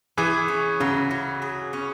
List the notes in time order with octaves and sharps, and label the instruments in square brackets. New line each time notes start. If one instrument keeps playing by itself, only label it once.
[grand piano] E3 [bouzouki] G#4
[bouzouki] C#4
[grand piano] C#3 [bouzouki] F#3
[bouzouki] F#3
G#4
C#4